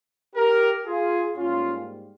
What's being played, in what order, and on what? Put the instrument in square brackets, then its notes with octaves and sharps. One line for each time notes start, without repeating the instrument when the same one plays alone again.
[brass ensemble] G4 A#4
F4 G#4
G#2 G3 A#3 C#4 F4